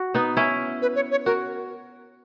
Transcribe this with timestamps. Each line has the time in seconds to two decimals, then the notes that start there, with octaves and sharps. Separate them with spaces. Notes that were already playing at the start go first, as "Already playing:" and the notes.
Already playing: F#4
0.14 B3 D#4
0.37 C#4 E4
0.82 B4
0.96 C#5
1.11 C#5
1.25 F#4 A#4